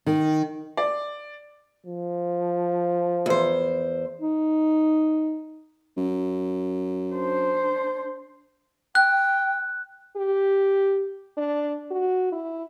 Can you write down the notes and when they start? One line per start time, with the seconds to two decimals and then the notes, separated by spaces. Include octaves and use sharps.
0.07 D#3
0.77 D5
1.86 F3
3.26 E2 C5
4.20 D#4
5.97 F#2
7.13 D4 C5
8.95 G5 F#6
10.17 G4
11.37 D4
11.91 F#4
12.32 E4